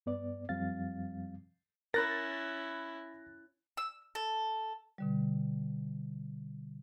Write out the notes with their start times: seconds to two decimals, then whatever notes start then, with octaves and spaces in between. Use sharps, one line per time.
0.06 G2 B3 D5
0.49 F#2 F3 G3 C4 F5 A6
1.94 C#4 E4 A#4 B5 F#6 A6 A#6
3.77 E6
4.15 A4
4.98 B2 D3 G3